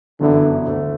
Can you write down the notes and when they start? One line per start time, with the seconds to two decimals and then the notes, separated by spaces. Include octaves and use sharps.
0.20 G1 F#2 D3 E3 B3 E4
0.65 D2 D3 A3